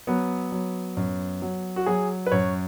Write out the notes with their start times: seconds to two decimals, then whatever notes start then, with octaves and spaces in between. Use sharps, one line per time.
0.07 F#3 B3
0.52 F#3
0.97 F#2
1.42 F#3
1.76 F#4
1.86 F#3 G#4
2.26 B4
2.32 F#2 C#5